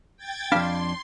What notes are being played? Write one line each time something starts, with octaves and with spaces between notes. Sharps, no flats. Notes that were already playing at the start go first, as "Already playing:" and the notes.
G5 G#6 A6
F2 D4 F5 B5 C6